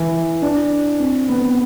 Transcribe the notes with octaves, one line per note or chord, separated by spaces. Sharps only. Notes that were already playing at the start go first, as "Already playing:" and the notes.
Already playing: E3
D4
C4
B3